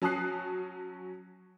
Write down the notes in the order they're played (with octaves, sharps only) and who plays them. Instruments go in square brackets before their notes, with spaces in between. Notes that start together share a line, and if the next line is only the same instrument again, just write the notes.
[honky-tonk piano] F#3 C#4 A5 D#6 F#6 C7